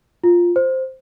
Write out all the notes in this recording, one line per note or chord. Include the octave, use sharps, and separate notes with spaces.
F4
C5